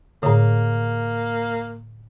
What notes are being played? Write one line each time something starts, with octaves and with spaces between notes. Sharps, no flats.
A2 D3 A#3